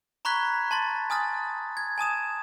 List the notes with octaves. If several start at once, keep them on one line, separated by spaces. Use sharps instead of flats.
A#5 B5 C#6 F#6 G#6 B6
A5 C6 A6
G#5 D#6 F6 A6
G#6
G#5 A5 D#6 E7